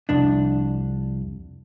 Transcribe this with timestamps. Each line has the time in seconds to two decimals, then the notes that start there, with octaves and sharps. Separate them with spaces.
0.09 C2 F2 D4